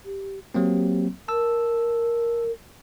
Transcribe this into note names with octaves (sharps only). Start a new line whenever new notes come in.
G4
F#3 A#3 C4 G4
A#4 A5 E6